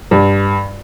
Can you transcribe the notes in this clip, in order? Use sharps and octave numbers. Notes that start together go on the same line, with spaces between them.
G2